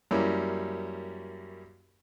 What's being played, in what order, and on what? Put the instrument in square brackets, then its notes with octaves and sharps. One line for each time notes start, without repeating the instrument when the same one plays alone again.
[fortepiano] F#2 G3 A#3 C#4 E4